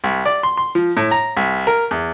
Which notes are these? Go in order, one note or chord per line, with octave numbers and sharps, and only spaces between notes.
C2
D5
C6
C6
F3
A2
A#5
C2
A#4
E2